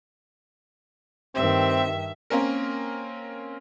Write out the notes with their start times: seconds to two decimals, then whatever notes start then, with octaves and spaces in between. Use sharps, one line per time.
1.35 G2 D#3 C4 E5
2.30 A#3 C4 C#4 A#4